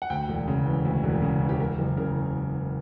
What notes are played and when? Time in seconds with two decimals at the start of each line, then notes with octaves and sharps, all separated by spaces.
0.02 F#5
0.10 D2 G5
0.29 E1
0.48 C#3
0.66 E3
0.85 D2
1.03 E1
1.22 C#3
1.41 E3
1.49 G4
1.60 E2 A#4
1.78 F#1
1.97 C#3 A#4